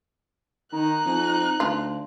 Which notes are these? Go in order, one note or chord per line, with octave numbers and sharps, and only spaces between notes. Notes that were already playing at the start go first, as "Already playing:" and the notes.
D#3 D#4 A#5 F#6
F2
D2 F4